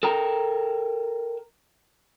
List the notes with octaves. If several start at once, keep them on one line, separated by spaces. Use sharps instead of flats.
A4 A#4 G5 A#5